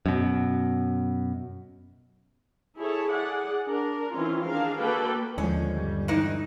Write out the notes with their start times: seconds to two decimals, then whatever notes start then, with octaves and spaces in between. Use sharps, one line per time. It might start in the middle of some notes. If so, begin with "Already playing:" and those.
0.06 F#2 B2
2.77 E4 G#4 A4 C#5
3.13 G#4 D5 F#5
3.67 D4 A#4
4.14 D#3 E3 C4 C#4 F4
4.45 D4 G#4 A#4 F5
4.80 A#3 F#4 A4 B4 D5 G5
5.38 D#2 D3 F3 G#3 C#4
5.73 G1 G3
6.08 G2 E3 D#4